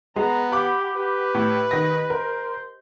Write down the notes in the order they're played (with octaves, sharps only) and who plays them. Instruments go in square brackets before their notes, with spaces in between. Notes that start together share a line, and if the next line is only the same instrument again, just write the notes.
[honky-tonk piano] G#3 [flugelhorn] B3 [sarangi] A#5
[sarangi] G4 [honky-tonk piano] F#5 B5 D6
[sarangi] G4 [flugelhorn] B4
[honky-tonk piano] A2
[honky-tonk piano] D#3 A#6 [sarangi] D#5
[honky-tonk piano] A#4 [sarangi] C5